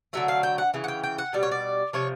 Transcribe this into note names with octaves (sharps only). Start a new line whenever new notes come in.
D3 F#3 A3 E5
F5
G5
F#5
C#3 E3
F#5
G5
G5
F#5
B2 G3 D5
C#5
D5
C3 F3 C#5